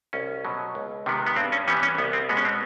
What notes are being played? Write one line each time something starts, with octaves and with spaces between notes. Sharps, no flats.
C2 C#4
B2 F#3
C#2
C3 D#3 G#3 B3
B3
G2 C4
C#4
E3 G3 B3 C#4
C#4
C2 B3
C4
B2 G#3 B3
C#4
C4